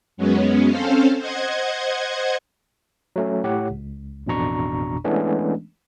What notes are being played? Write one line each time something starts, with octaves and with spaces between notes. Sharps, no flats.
F#2 F#3 G#3 B3 C#4
C4 C#4 A4 C5 F5
C5 D#5 F#5 G#6
F#3 A3 C#4
A2 G4 C#5 F#5
C#2
A1 F2 B2 D4 A#5 C#6
E3 G#3 A3 B3 C#4 D4